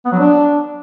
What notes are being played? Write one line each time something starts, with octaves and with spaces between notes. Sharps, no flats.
B3
F#3
D4